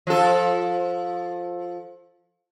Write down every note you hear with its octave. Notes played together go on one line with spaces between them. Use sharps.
F3 A4